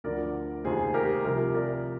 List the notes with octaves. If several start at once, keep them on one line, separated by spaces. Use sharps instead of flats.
D2 D3 F3 A#4 D5
F1 D#2 D#3 G#4 C5
G4 A#4
C2 C3 F3 G4 A#4
A#4 D5